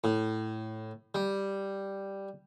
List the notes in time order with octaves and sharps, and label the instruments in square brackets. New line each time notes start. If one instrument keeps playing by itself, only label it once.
[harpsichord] A2
G3